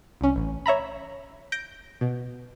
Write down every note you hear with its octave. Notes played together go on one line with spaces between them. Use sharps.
C2 C#4
A1
C#5 E5 A#5 B5
G6 A#6 D7
B2